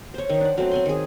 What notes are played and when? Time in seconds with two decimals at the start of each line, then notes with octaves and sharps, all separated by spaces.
0.14 C5 C#5
0.30 D#3 D#4
0.41 D4 F#5
0.58 F#3 A3 C4
0.71 C4 G#5 C6
0.86 D#3 G#4